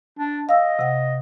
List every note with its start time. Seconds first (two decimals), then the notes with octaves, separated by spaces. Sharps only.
0.19 D4
0.49 D#5 F5 E6
0.79 C3 F#5